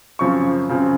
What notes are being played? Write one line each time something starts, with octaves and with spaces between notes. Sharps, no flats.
F#2 C#3 F3 C4 C#6
F#2 C#3 F3 C4